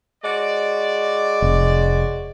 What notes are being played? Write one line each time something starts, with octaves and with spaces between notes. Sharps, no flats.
G#3 F#4 C#5 D5
F1